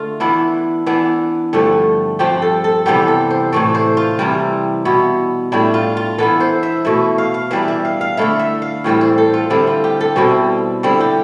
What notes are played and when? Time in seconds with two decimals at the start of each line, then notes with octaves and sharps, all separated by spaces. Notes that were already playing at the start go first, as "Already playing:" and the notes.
Already playing: D3 A3 F4 A4
0.20 E3 B3 D4 E4
0.86 E3 B3 D4
1.53 G2 D3 F3 A3
2.19 G2 F3 C4 G4
2.42 A4
2.64 A4
2.86 C3 E3 G3 B3 G4
3.08 A4
3.31 C5
3.52 A2 E3 A3 D5
3.75 C5
3.97 F4
4.19 C3 E3 G3 E4
4.85 B2 B3 E4
5.52 A2 G3 D4 E4
5.74 F4
5.97 F4
6.18 E3 B3 E4 A4
6.40 C5
6.63 E5
6.85 B2 A3 E4 E5
7.18 F5
7.34 F5
7.51 E3 G3 D4 E5
7.68 E5
7.85 F5
8.01 F5
8.17 D3 A3 E4 E5
8.40 E5
8.62 F5
8.84 A2 E3 G3 C4
9.01 C5
9.18 A4
9.34 F4
9.50 D3 G3 C4 E4
9.67 F4
9.84 G4
10.01 A4
10.16 B2 G3 C4 E4
10.83 D3 G3 C4 E4
11.00 G4